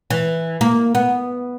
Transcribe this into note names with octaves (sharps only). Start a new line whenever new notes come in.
E3
A#3
B3